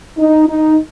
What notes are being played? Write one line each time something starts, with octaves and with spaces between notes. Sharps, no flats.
D#4
D#4